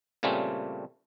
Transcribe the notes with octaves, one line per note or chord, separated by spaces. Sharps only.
A#2 C#3 G3 A3 C4 C#4